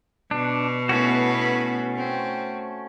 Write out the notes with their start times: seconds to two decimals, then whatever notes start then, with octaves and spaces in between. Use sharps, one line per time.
0.31 B2 D4
0.89 A3 B3 C#4 E4 F#4 B4
1.96 C4